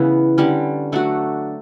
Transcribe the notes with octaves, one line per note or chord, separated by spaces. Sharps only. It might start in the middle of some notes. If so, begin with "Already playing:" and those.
Already playing: C#3 E3 B3 E4
D3 G3 C#4
F#3 A3 D4 F#4